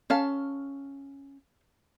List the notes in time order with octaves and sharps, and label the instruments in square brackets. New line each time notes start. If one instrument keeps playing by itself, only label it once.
[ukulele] C#4 [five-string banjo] A4 F5 A5